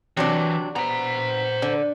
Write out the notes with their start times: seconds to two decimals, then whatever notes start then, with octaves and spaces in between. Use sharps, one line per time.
0.17 C3 E3 F#3 D4
0.76 B3 C5 A#5
1.62 D3